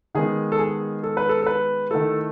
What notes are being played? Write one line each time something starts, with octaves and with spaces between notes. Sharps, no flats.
D#3 G#3 B3 G#4
A4
G#4
A4
B4
A4
A4
B4
D#3 A3 E4 A4